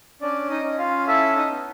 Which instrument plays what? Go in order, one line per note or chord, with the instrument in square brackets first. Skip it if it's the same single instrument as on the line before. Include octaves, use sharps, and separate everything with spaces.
[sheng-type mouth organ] C#4 D4 D5
D#4 D#5
C#4
F4 F5
E4 A4 E5
D#4 D#5
B3